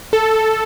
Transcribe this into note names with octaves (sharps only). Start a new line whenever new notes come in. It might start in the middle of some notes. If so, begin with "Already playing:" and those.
A4